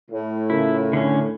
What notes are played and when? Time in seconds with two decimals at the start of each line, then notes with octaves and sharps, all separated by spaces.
0.11 A2
0.50 C#3 E4 F4 A#4
0.93 D3 C#4